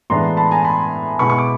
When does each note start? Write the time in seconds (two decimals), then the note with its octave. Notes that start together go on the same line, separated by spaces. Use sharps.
0.10 A2 E3 G#3 B3 D4 A#5 C6
0.37 A5 B5
0.51 G#5 A#5
0.64 A5 B5
1.19 B2 G#3 B3 E4 B5 C#6
1.30 C#6
1.38 D6